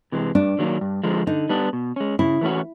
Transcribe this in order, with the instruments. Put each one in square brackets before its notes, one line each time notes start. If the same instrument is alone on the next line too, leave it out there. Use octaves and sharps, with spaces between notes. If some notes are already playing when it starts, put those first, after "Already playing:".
[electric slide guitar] C3 E3 G#3
[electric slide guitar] G2 [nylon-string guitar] D4
[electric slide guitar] D#3 F#3 A#3
G2
D3 F3 G#3
[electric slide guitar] D3 [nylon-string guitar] D#4
[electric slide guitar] G3 B3 D4
B2
G#3 C#4
[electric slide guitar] C#3 [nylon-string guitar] E4
[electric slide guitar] E3 A3 C#4 F#4